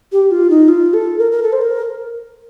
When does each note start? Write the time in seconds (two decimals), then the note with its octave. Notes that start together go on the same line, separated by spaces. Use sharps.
0.12 G4
0.31 F4
0.50 D#4
0.68 F4
0.94 A4
1.19 A#4
1.32 A#4
1.43 A4
1.53 C5
1.61 A#4